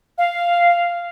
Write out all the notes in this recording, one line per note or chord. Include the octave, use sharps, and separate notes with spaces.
F5